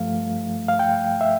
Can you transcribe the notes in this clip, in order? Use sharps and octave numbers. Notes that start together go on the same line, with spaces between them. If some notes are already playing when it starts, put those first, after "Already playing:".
Already playing: G2 F3 A3 F5
F5
G5
E5